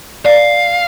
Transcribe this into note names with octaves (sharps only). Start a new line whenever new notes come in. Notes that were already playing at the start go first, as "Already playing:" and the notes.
D5 F5